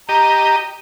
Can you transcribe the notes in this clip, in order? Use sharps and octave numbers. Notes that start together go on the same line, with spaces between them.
G4 D#5 A#5